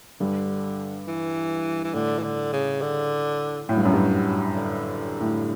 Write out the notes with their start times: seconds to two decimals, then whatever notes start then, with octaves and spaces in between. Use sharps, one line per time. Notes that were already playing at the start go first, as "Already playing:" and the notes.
0.20 G2 D3
1.07 E3
1.84 E3
1.94 A2 D3
2.19 E3
2.23 D3
2.53 C#3
2.81 D3
3.68 A2 F#3
3.77 G2
3.85 F#2
3.93 G2
4.56 D3
5.21 A2